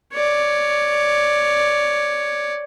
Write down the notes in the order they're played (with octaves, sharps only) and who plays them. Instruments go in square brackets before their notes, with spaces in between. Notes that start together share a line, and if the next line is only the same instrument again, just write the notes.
[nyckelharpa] C#5 D5